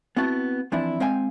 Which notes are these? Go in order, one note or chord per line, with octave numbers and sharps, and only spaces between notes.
B3 C4 E4 F#4 A5
E3 F3 C4 D4 E4
G#3 C4 C5 F5 G5 G#5